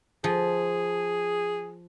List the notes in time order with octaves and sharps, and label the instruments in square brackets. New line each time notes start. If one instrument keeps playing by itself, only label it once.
[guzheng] F3 [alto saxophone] G#4